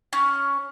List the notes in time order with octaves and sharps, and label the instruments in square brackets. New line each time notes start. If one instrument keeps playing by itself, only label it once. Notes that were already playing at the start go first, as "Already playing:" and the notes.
[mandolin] C#4